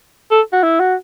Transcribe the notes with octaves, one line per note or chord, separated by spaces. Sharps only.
A4
F#4
E4
F#4